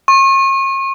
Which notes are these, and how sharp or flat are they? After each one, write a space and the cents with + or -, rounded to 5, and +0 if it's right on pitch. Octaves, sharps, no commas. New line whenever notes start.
C#6 -40